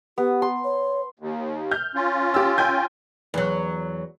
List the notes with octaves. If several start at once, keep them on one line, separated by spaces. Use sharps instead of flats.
B3 G4
C6
C#5
D#2
F6 G6
C#4 F4
G4 E6
G5 G#5 G6
E2 F#3